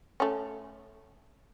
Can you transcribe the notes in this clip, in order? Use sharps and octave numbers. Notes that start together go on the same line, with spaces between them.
A3 C#4